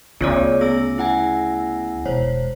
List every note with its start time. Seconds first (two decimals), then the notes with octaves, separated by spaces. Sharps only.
0.21 D2 C#3 B3 C#4 F4 C#5 D5
0.61 B3 G#4 E6 A#6
0.98 E4 F#5 G#5
2.05 E1 C5 C#5